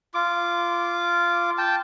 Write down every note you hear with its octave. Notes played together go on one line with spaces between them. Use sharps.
F4 D6
G5 A5